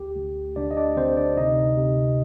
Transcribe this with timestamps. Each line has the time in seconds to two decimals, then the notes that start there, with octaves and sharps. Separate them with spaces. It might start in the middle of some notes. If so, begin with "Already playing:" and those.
Already playing: D2 G4
0.16 D2
0.56 D2 D4 D5
0.71 D#5
0.77 D4 D5
0.97 D3 C4 C5
1.17 D4 D5
1.37 C3 D#4 D#5
1.77 C3